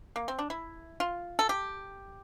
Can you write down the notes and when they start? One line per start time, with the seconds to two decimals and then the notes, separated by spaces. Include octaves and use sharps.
0.16 A#3
0.28 C4
0.39 D4
0.50 E4
1.00 F4
1.39 A4
1.49 G4